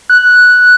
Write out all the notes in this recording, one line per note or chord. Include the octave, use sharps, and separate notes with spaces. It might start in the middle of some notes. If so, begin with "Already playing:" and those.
F#6